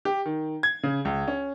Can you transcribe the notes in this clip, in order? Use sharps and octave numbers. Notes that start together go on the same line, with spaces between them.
G4
D#3
G#6
C#3
C#2
C#4